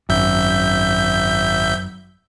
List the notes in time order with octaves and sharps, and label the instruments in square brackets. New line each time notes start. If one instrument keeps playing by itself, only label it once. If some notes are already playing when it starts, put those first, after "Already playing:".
[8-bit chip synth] G#1 E5 G6 [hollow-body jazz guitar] F#2